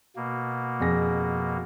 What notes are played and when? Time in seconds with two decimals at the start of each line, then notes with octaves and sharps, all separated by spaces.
0.16 B2 A#3
0.80 F2 G#4 A#6